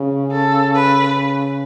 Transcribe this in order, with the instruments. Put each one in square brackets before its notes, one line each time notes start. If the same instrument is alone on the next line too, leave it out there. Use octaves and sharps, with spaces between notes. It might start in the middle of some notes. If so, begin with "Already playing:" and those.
Already playing: [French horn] C#3
[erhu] A4
B4